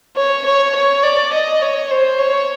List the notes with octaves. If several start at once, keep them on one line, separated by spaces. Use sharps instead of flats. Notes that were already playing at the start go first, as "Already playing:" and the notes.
C#5
C#5
C#5
D5
D#5
C#5
C5
C#5